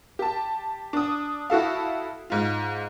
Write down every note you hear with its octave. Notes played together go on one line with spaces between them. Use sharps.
G4 A5
D4 D#6
E4 F#4 A4 F5
G#2 F4